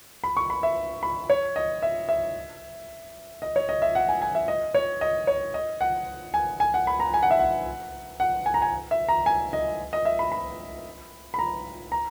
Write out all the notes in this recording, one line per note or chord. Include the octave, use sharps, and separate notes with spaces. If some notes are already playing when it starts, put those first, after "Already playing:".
B5
C#6
B5
E5
B5
C#5
D#5
E5
E5
D#5
C#5
D#5
E5
F#5
G#5
G#5
E5
D#5
C#5
D#5
C#5
D#5
F#5
G#5
G#5
F#5
B5
A#5
G#5
F#5
E5
F#5
F#5
G#5
A#5
G#5
E5
A#5
G#5
D#5
D#5
E5
B5
B5
B5
A#5
A#5